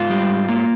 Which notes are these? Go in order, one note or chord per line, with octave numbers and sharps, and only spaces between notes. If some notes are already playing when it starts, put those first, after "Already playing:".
Already playing: G#2 F4
G3
G#2
A#3